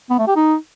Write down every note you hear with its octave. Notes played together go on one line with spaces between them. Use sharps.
B3
A3
G4
D#4